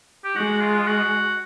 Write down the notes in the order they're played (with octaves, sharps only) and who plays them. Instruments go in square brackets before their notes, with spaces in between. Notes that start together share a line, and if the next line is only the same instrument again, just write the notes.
[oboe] G4
[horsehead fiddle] G#3 [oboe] F#4
[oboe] F4
F#4